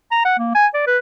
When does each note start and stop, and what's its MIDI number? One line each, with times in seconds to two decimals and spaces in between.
0.12 0.24 82
0.25 0.36 78
0.39 0.53 58
0.55 0.67 80
0.74 0.82 74
0.87 0.98 71